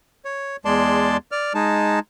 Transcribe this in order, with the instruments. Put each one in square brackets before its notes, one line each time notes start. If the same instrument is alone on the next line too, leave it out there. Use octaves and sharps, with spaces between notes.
[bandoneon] C#5
E2 G#3 D5 A5 C6
D5 F6
G#3 D#4 A5